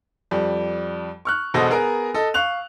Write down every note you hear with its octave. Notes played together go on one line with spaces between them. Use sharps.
F2 G3
C#6 F6 F#6
E1 B2 A4 C5 D#5
B3 G#4 A#4 A#5
A4 D#5
F5 C#6 F#6 F7